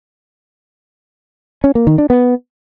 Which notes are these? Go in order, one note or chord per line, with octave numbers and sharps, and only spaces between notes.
C#4
A#3
D#3
D4
B3